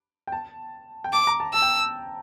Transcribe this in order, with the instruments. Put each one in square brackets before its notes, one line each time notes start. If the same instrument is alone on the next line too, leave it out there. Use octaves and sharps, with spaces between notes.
[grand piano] G5
A5
G5
[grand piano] A5 [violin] D6
[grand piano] A#5
A5
[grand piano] A5 [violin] E6
[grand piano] G5